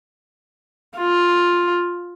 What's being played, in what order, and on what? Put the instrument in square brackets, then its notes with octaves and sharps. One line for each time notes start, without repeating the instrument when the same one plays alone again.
[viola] F4